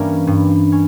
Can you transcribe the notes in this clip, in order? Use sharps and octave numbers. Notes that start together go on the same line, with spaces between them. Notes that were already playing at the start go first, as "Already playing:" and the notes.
Already playing: G2 E3 G3 A#3 C#4 A#4 D5
G2
C#4